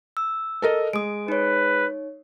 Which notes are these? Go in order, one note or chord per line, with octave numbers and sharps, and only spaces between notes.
E6
A4 A#4 D#5
G#3 D#6 D7
D#4 B4 C#5